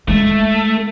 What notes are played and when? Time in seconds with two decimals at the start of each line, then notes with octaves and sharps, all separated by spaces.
0.08 G#3 A3 E4